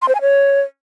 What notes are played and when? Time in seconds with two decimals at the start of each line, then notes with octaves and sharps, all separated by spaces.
0.02 C6
0.08 C5
0.15 G#5
0.21 C#5